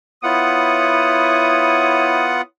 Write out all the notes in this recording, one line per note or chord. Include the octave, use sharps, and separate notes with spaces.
B3 E4 F4 C#5 F#5 D#6